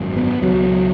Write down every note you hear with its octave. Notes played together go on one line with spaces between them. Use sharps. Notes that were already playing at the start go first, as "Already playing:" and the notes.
Already playing: G#1 F#2
B3
C#2 B2 F#3